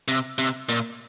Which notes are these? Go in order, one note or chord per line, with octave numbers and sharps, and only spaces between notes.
C3
C3
A#2